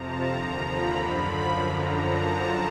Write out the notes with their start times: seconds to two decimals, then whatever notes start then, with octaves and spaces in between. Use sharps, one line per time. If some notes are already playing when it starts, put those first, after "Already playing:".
Already playing: F2 C3 F3 A5 A#5
0.26 D#2 D3 F3 A#5
0.59 B5
0.94 F#2 D3 F3
1.63 F#2 D3 F3 A#5
1.96 A5